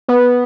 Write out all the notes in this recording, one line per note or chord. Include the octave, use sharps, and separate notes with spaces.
B3